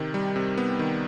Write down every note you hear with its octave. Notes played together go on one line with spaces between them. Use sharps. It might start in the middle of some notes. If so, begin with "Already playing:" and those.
Already playing: C3 D#3
G3
C3
B3
D#3